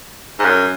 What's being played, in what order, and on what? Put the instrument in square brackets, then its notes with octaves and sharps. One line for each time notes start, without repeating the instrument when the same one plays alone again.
[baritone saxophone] G#2
F#2